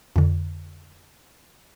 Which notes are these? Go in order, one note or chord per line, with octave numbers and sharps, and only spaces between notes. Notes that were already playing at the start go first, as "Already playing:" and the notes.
F2 D3